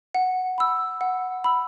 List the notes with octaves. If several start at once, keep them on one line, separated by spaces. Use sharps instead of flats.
F#5
B5 E6
F#5
B5 E6